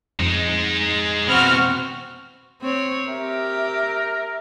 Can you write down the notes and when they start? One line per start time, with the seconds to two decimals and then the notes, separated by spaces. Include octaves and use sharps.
0.19 F2 G#3 D#4
1.28 B2 E3 C4 F#4 F6
2.62 C4 C#5
3.08 G4 A#4 E5